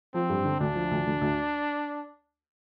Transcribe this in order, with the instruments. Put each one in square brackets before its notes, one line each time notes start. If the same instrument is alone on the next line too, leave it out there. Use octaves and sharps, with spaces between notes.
[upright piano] F3 [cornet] C4
[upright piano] G2
D3
[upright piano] D2 [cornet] D4
[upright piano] F3
D2
D2
D2